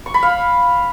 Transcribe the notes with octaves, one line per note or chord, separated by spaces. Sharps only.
C#6
B5
F5